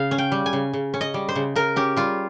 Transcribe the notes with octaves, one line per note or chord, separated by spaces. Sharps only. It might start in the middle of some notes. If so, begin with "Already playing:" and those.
Already playing: C#3 F5
C#4
G5
G3
G#5
C#3
C#3
C#4
D#5
G3
C5
C#3
C#3 A#4
C#4 G4
G3 F4